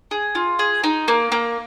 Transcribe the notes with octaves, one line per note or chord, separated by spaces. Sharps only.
G#4
F4
G#4
D#4
A#3
A#3